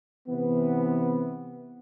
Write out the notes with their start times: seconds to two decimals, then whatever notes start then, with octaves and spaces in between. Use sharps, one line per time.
0.28 C3 E3 B3